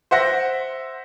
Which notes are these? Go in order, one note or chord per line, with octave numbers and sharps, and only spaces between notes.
C5 E5 F#5 A#6